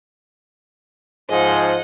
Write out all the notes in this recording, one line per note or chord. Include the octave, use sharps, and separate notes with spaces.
G#2 F3 G#4 D#5 F#5